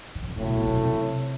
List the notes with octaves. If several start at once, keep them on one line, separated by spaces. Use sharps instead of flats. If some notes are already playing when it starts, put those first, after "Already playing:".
D#3
D3
C#3
A2 C3 F#3 A3
B2
A#2
C3
C#3
C3